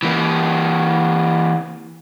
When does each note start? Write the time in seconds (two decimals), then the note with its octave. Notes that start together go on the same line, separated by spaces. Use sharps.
0.03 E3 A#3